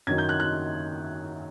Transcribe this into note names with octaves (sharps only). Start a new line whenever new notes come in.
F#2 D#3 F#3 G#6
G6
F#6
F#6